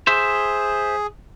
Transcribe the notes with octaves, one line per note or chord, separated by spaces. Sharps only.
G#4 C5 E5